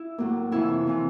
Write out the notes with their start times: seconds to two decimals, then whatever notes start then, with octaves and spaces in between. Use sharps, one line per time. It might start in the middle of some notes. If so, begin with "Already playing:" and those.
Already playing: E4
0.18 A2 F#3 A#3
0.52 F2 C3 E3 E4
0.87 C3 E3